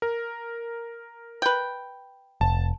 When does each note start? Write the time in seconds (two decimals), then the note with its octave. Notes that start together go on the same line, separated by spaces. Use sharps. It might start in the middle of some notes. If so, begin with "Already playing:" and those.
0.02 A#4
1.42 B4 G5
2.41 F1 A5